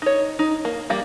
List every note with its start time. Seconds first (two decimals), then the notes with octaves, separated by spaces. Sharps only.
0.02 D#4 C#5
0.39 D#4
0.65 A#3
0.90 G3 A#3 F5